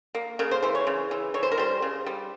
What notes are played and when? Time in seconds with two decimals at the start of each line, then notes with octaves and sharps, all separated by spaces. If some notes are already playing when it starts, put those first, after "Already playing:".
0.15 A#3
0.39 C#3 A#4
0.51 C5
0.63 E3 C5
0.75 C#5
0.87 C#3
1.11 E3
1.34 E3 C#5
1.43 C5
1.51 A#4
1.58 G3 C5
1.82 C#3
2.06 G3